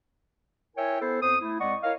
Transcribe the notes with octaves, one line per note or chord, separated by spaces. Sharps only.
E4 A#4 C#5 E5 G5 G#5
B3 E4 A4 C5
F2 B3 C5 D#6
A3 E4
F2 G#3 D5 D#5 F#5 C#6
E4 A#4 C#5 D#5 F5